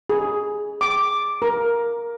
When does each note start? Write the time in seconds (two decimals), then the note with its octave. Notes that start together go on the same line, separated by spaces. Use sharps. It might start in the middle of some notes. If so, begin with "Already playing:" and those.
0.10 G#4
0.81 D6
1.42 A#4